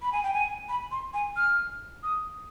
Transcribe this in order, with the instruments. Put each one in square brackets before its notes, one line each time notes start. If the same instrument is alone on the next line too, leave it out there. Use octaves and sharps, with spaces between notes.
[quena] B5
G#5
G5
G#5
B5
C6
G#5
F6
D#6